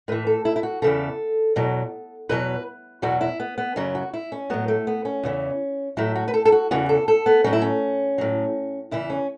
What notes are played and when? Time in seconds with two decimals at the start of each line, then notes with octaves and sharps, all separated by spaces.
0.08 A2 E3 B4
0.27 A4
0.45 E4
0.56 E4
0.63 F#4
0.82 E2 C#3 E3 A4
1.56 E2 B2 F#3
2.29 E2 B2 F#3 B4
3.02 E2 B2 F#3 F#4
3.21 E4
3.40 B3
3.58 B3
3.76 F#2 C#3 F#3 C#4
3.95 F#4
4.14 E4
4.32 C#4
4.50 A2 F#3 B3
4.68 A3
4.87 B3
5.05 C#4
5.23 E2 C#3 E3
5.97 A2 F#3 E4
6.15 F#4
6.28 B4
6.34 A4
6.45 A4
6.52 F#4
6.71 E2 C#3 E3 F#4
6.89 A4
7.08 A4
7.26 B3
7.44 A2 F#3 C#4
7.53 E4
7.62 C#4
8.18 A2 F#3
8.91 E2 C#3 E3 E4
9.10 C#4